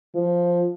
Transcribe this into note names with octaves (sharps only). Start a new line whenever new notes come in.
F3